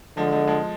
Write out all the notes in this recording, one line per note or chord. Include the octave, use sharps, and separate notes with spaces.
D3 F3 G#3
F3 G#3
F3 G#3